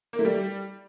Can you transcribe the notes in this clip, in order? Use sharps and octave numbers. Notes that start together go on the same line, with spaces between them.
A#3
A3
G3